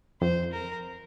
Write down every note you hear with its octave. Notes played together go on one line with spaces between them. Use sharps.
F2 C5
A#4